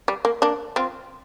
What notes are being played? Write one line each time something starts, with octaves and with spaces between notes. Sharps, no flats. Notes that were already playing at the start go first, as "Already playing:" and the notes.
G3
A#3
A#3 D4
C4 F4